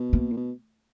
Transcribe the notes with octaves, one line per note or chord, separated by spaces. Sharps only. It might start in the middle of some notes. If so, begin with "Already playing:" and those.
Already playing: B2
A#3
A#2
B2